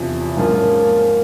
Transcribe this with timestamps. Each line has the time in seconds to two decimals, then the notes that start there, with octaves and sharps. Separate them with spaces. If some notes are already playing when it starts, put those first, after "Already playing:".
Already playing: E2 C3 F3
0.37 G#2 F3 A#3 C#4 F4